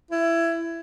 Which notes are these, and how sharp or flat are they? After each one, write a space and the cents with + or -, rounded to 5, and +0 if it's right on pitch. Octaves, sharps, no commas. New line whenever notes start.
E4 +20